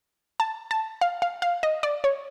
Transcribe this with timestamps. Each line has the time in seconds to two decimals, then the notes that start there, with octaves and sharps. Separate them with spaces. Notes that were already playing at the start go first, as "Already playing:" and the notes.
0.40 A5
0.71 A5
1.01 F5
1.22 F5
1.42 F5
1.63 D#5
1.83 D5
2.04 C#5